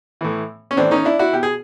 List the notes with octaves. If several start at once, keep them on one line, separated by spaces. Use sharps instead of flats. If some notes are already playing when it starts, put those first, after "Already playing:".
A2 E3
C#4
A2 E3 C4 D4
C#4 D#4
D4 E4
E4 F#4
B2 G4
G#4